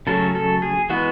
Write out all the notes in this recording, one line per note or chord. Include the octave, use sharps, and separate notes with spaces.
C#3 F#3 A3 C#4 A4
A4
G#4
E3 G#3 B3 F#4